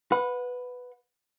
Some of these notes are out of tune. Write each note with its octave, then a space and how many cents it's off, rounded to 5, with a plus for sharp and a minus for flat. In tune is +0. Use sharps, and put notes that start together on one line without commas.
B4 +5 F#5 -25